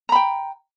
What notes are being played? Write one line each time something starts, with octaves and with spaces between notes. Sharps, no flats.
G5 A#5 B5